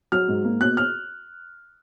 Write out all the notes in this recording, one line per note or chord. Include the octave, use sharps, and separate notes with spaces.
F#3 F6
G#2
A#3
B2 F#6
F6